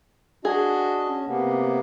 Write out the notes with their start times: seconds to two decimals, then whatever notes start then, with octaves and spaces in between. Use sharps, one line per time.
0.45 D4 F#4 G#4 D#5
1.08 C#4
1.27 C3 A#3 B3